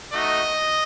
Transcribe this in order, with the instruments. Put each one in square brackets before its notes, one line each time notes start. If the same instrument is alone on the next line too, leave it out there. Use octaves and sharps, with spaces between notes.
[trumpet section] A3 D#4 F#4 D#5